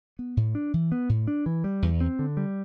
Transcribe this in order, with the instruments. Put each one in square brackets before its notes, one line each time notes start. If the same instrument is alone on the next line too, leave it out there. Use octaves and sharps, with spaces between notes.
[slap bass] B3
A2
D4
E3
B3
A2
D4
E3
G3
E2
C4
D3
G3